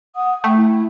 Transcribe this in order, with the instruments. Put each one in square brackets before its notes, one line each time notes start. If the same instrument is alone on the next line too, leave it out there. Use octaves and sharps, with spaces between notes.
[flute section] F#5 D#6
[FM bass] A3 [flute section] G5
[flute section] E4